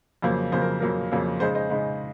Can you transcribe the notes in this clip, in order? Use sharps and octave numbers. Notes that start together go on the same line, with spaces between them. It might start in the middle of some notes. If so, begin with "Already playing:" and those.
F2 C#3 F#3 A#3 C5
F2 C#3 F#3 A#3 C5
A#4
F2 C#3 F#3 A#3 A#4
F2 C#3 F#3 A#3
C#3 G#3 D#4 C5
C5 D#5
C#3 G#3 D#4